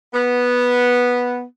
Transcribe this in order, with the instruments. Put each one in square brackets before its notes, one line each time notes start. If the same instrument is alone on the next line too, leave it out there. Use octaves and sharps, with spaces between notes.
[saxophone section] B3